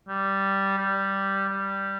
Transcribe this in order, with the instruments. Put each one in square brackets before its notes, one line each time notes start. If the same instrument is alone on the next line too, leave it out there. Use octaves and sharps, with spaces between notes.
[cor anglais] G3
G3
G3